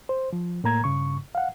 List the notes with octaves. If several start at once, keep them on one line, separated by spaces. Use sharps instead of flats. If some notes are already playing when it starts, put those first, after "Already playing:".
C5
F3
A2 A#3 A#5 G#6
G2 C#3 C#6
F5 F#5